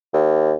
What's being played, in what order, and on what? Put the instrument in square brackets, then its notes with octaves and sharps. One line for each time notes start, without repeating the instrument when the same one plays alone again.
[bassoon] D#2